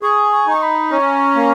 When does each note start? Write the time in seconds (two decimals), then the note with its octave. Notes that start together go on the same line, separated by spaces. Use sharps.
0.02 G#4 C#6
0.32 C#6
0.47 D#4 C#6
0.62 B5
0.91 C#4 A#5
1.36 A#3